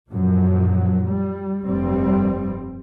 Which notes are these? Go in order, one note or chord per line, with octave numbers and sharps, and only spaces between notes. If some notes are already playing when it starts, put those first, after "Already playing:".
F#2 A#2 F3 F#3
G3
F1 G2 G3 C4